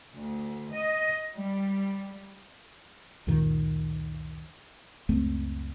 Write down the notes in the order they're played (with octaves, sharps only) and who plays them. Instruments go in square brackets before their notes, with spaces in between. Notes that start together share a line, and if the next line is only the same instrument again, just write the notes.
[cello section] D2
D#5
G3
[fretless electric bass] C#2 F#2 A#2 D#3
C#2 F#2 A3 C4